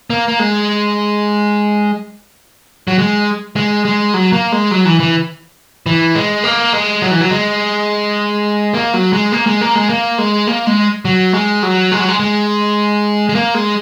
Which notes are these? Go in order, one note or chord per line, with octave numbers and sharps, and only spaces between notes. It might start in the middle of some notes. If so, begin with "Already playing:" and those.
A#3
A#3
G#3
F#3
G#3
G#3
G#3
F#3
A#3
G#3
F#3
E3
E3
E3
G#3
A#3
G#3
F#3
E3
F#3
G#3
A#3
F#3
G#3
A#3
G#3
A#3
G#3
A#3
G#3
A#3
G#3
F#3
G#3
F#3
G#3
F#3
G#3
G#3
G#3
A#3
G#3